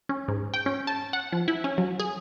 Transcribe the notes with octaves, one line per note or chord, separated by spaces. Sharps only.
C#4
G#2
G5
C#4
A5
F#5
F3
E4
C#4
F#3
G#4